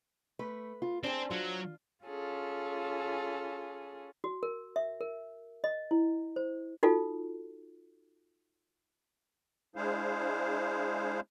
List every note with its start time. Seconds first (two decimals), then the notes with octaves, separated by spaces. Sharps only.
0.39 A3 B4
0.82 F4
1.04 C4 D4 G#4 C5
1.31 F#3 F4
2.06 C#4 F4 G#4 A4
4.24 F#4
4.43 A#4
4.76 E5
5.01 A#4
5.64 D#5
5.91 E4
6.36 C5
6.83 D#4 F4 F#4 A4
9.76 G#3 D4 E4 G#4 C5 F5